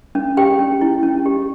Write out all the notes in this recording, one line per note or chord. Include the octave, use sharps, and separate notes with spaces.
C#4
G4 G5
C#4
E4
C#4
G4